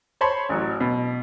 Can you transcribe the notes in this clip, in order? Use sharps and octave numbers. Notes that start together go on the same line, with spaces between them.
C5 C#5 A5 B5 C6
A1 F#3
B2